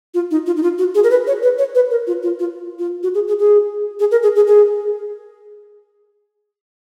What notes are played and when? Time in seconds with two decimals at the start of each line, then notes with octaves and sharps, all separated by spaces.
0.14 F4
0.31 D#4
0.46 F4
0.56 D#4
0.63 F4
0.78 F#4
0.95 G#4
1.03 A#4
1.10 B4
1.27 C#5
1.43 B4
1.58 C#5
1.75 B4
1.91 A#4
2.07 F4
2.23 F4
2.39 F4
2.79 F4
3.03 F#4
3.14 G#4
3.27 G#4
3.39 G#4
3.99 G#4
4.11 A#4
4.22 G#4
4.36 G#4
4.47 G#4